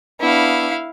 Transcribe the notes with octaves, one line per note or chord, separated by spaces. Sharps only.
B3 D4 E4 F5